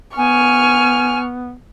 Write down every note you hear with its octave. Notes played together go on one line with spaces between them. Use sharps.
B3 G#5 C#6 F6